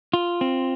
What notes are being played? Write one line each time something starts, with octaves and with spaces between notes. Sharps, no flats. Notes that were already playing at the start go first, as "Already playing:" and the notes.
F4
C4